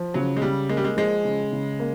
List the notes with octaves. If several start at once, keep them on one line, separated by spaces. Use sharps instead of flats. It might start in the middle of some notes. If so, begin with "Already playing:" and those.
Already playing: F3
C#3 F#3
G#3
C#3 G3
G#3 A#3
G3
G#3
F3 G#3
C#3
C#3
A#3